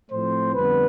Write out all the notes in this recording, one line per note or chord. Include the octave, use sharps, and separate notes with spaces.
A2 F3 A3 C4 C5
F2 D3 G3 B3 B4